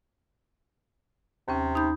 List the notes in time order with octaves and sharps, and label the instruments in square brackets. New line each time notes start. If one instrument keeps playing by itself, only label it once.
[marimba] D#2 C#4 [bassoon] C3
[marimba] D#4 B5 G6